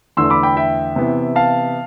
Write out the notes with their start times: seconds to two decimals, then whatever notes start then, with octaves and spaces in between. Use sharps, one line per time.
0.17 E2 D3 A3 C6 E6
0.30 B5 D6
0.43 G5 B5
0.57 E5 G5
0.96 C3 E3 B3
1.36 F5 A5